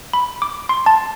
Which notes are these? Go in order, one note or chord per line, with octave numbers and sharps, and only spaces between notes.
B5
D6
C6
A5